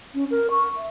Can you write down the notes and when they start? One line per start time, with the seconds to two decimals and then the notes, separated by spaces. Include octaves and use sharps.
0.14 C#4
0.30 A#4
0.50 C#6
0.76 E5